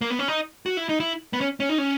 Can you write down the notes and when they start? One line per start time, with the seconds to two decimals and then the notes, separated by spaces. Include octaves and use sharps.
0.01 A#3
0.10 B3
0.19 C#4
0.28 D#4
0.66 F#4
0.77 E4
0.89 D#4
1.00 E4
1.33 B3
1.41 C#4
1.60 C#4
1.69 D#4
1.78 C#4